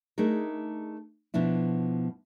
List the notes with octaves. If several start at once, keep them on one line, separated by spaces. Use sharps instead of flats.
A3 D4 D#4 G#4 A#4
B2 F3 D4 E4